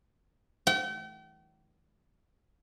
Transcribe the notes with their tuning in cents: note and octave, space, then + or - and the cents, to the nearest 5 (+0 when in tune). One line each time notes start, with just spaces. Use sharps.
G5 -40